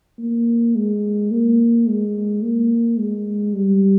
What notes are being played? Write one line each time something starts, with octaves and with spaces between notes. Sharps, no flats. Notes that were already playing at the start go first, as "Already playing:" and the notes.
A#3
G#3
A#3
G#3
A#3
G#3
G3